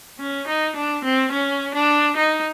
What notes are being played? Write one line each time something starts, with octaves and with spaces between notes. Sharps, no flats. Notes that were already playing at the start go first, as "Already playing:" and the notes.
C#4
D#4
D4
C4
C#4
D4
D#4